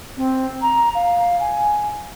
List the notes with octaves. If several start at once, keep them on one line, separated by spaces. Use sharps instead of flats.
C4
A#5
F5
G#5